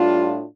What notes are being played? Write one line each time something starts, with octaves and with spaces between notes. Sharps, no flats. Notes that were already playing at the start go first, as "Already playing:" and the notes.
Already playing: A2 G3 D4 F4